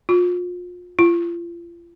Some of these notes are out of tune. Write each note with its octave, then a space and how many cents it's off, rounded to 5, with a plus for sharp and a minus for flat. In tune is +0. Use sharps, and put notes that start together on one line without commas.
F4 +35
F4 -35